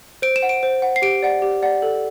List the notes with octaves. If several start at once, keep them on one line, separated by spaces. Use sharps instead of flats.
C5 D7
E7
F#5
D7
C5
F#5
C7
G4 D7
D5 F#5
G4
D5 F#5
A4